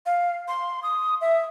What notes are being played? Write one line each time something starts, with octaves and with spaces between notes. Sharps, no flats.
F5
C6
D#6
E5